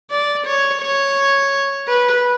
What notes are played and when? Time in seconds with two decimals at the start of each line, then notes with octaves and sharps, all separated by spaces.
0.11 D5
0.46 C#5
0.81 C#5
1.88 B4